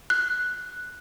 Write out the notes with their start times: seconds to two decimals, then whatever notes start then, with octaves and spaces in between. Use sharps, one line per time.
0.10 F#6